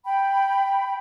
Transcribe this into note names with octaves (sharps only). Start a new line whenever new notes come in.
G5 B5